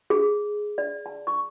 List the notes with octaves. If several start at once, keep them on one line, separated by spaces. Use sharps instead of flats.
G#4
D5
A5
C#6